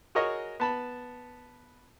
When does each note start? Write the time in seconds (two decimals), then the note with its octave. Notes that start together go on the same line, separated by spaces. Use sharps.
0.15 F#4 G#4 A#4 C#5 D#5
0.60 B3 A5 B5